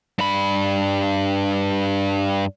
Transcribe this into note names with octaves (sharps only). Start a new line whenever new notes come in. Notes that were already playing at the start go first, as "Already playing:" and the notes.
G2 B5